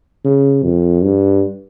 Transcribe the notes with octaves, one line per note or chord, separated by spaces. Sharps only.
C#3
F2
G2